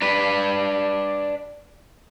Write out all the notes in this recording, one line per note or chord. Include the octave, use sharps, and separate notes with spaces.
D4 B4